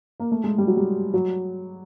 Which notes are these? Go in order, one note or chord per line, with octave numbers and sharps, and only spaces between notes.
A#3
A3
G#3
G3
F#3
G3
F#3